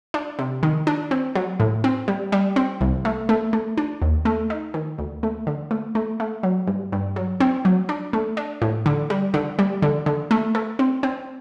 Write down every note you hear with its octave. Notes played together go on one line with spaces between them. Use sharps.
D4
C3
D#3
D4
C4
F#3
A2
C4
G3
G3
C4
C2
A3
A3
A3
D4
D#2
A3
D#4
D#3
D2
A3
D3
A3
A3
A3
F#3
G2
G2
F#3
C4
F#3
D4
A3
D4
A2
D3
G3
D3
G3
D3
D3
A3
A3
C4
C4